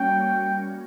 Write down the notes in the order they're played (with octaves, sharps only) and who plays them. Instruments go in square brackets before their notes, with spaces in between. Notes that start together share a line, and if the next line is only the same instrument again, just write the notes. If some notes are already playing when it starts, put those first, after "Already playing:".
Already playing: [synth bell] G3 A#3 C#4 F#4 [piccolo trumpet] G5